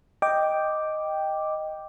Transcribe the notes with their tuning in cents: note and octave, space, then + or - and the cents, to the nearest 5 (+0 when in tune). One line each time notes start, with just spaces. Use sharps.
D#5 +0 G5 +0 D6 +0